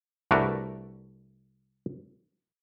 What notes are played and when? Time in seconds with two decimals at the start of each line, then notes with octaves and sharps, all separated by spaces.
0.31 C2 A3 D4 F#4 A#4 B4